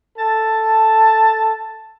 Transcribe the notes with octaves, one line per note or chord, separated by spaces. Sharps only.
A4 A5